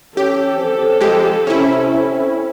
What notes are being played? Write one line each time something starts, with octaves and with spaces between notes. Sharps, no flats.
C#4 G4 A4
C4
F2 G#3 G4
C3 C#4 E4
C4